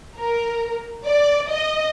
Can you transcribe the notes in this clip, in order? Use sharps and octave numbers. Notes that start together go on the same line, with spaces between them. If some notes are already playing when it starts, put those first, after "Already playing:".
A#4
D5
D#5